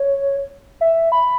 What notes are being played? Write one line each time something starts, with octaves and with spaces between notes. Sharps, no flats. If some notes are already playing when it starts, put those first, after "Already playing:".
Already playing: C#5
E5
B5